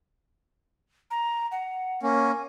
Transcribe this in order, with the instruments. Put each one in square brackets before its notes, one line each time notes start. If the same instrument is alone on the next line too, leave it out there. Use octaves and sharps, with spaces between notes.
[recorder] A#5
F#5
[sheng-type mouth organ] A#3 C#4 [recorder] G#5